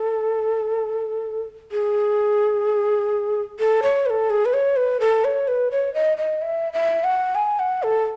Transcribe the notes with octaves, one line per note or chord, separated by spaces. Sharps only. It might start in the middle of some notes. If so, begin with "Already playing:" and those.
Already playing: A4
G#4
A4
C#5
B4
A4
G#4
B4
C#5
B4
A4
C#5
B4
C#5
D#5
D#5
E5
E5
F#5
G#5
F#5
A4